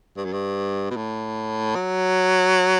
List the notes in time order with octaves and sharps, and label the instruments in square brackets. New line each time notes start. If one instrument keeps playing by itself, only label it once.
[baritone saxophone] G2
F#2
G2
B2
A2
F#3